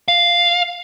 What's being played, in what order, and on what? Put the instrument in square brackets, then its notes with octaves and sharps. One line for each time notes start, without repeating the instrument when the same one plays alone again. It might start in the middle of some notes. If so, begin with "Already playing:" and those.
[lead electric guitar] F5